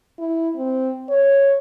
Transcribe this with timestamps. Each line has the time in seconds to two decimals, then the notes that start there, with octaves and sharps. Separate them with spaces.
0.19 E4
0.57 C4
1.10 C#5